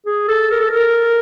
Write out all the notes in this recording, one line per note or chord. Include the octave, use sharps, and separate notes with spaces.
G#4
A4
A#4
A4
A#4